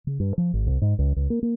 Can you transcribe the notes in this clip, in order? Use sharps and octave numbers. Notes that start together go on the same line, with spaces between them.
C#3
G2
F3
G#1
C2
G#2
C#2
C#2
A#3
A#3